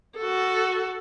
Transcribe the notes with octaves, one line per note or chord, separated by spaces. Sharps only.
F#4 A4